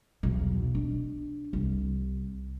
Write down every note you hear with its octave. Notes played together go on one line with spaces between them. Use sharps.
B1 E2
D4
C2